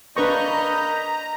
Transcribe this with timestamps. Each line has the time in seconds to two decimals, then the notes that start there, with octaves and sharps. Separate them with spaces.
0.17 A#3 D4 B4 D#5 A#5 B5 C#6 G6